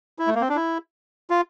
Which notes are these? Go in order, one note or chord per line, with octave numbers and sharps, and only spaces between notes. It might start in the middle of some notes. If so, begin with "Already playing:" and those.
E4
A3
A#3
C4
D4
E4
F4